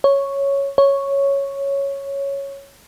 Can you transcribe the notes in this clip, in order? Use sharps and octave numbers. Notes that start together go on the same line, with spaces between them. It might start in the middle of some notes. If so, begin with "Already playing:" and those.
C#5
C#5